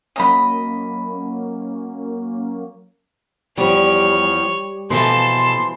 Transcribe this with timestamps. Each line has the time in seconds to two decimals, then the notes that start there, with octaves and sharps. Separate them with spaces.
0.16 F#3 A#3 C#4 D#5 B5
3.57 E2 F3 G3 C#5
4.90 B2 E3 F3 A4 A5 C6